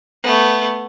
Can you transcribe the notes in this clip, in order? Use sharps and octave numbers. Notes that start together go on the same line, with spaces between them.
A3 B3